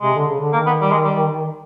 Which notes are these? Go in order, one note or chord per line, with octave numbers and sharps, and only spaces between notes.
C3 G#3
D3
C#3
D3
D#3 A#3
B3
G3
G#3
G3